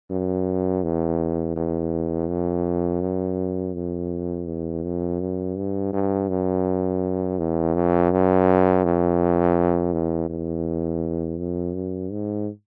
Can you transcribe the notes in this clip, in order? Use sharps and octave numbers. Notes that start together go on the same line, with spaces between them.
F#2
E2
E2
F2
F#2
F2
E2
F2
F#2
G2
G2
F#2
E2
F2
F#2
F2
E2
E2
F2
F#2
G#2